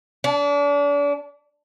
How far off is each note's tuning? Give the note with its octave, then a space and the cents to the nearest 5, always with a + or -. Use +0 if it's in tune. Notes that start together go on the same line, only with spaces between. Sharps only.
D4 -35